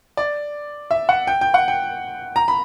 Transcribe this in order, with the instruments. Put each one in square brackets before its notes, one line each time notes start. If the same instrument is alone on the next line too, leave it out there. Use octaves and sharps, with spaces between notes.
[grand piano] D5
E5
F#5
G5
G5
F#5
G5
A#5
B5